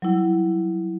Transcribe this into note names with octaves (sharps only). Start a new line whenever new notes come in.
F#3 G3 E4